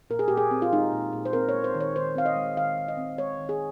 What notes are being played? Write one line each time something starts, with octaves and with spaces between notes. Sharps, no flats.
A#2 A#4
G#4
A#2 G4
G#4
C4
F4
G#3 D#4
A#2
A#2
C5
C4 A#4
C#5
G#3
C5
D#3
C#5
D#3 C5
C4 F5
D#5
G#3
D#3 F5
D#3
D#5
C4
G#3 C#5
D#3
G#4